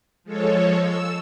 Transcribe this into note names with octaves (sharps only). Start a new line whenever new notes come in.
F3 G#3 A4 C#5
E6